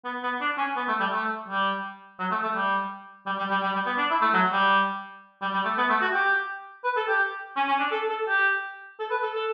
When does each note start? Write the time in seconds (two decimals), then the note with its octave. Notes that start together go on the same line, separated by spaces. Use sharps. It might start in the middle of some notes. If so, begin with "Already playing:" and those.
0.04 B3
0.23 B3
0.41 D4
0.58 C#4
0.76 B3
0.88 A3
1.00 G3
1.12 A3
1.48 G3
2.19 F#3
2.31 A3
2.43 A3
2.55 G3
3.26 G3
3.38 G3
3.51 G3
3.63 G3
3.75 G3
3.86 B3
3.98 D4
4.11 E4
4.22 A3
4.34 F#3
4.52 G3
5.41 G3
5.53 G3
5.65 A3
5.78 B3
5.89 A3
6.01 F#4
6.13 G4
6.84 B4
6.97 A4
7.08 G4
7.56 C#4
7.68 C#4
7.79 D4
7.91 A4
8.09 A4
8.28 G4
8.99 A4
9.10 B4
9.23 A4
9.35 A4